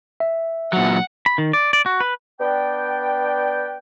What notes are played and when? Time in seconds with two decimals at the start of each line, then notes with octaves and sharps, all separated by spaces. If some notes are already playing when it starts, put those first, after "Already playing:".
0.20 E5
0.73 A#2 F#3 F#5
1.26 B5
1.38 D#3
1.53 D5
1.73 D5
1.86 F#4
2.00 B4
2.41 B3 D4 B4 D5 G5